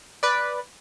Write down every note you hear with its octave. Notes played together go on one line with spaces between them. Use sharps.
B4 D5